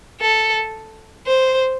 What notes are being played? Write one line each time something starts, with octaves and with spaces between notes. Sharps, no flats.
A4
C5